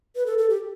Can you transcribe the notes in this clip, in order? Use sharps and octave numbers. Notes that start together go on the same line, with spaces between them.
B4
A4
A4
G4